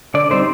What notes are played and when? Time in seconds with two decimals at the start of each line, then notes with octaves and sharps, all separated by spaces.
0.14 D3 D5
0.31 G3 C4 D#4 C5